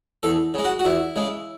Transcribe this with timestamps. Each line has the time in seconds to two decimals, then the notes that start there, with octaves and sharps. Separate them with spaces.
0.23 E2 A4
0.54 C#3 G#3
0.64 F#4
0.79 F#4
0.85 E2 E4
1.16 C#3 G#3